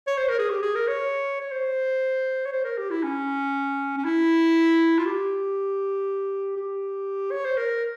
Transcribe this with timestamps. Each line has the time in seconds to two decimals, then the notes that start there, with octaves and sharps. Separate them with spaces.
0.07 C#5
0.18 C5
0.29 A#4
0.39 G#4
0.50 G4
0.62 G#4
0.75 A#4
0.88 C#5
1.41 C#5
1.52 C5
2.45 C#5
2.52 C5
2.64 A#4
2.78 G4
2.90 E4
3.03 C#4
3.97 C#4
4.05 E4
4.99 F4
5.06 G4
6.57 G4
7.31 C#5
7.45 C5
7.58 A#4